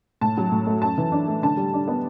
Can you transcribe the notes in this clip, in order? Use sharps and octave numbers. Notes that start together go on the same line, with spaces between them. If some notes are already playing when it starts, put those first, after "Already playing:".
A2 A5
F#3
A2
A3
F#2 A5
E3
D4
A3
D3 A5
G3
D4
B3